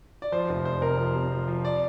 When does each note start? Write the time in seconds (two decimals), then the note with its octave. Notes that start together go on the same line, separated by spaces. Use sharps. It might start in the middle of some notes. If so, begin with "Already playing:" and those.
0.22 D5
0.32 F3 C5
0.49 F1
0.65 F1 C5
0.82 C3 A#4
0.99 F3
1.15 C3
1.32 F3
1.48 F3
1.65 D5